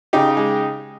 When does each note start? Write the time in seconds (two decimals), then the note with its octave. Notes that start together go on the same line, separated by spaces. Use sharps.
0.13 C#3 D#4 G4
0.37 G#3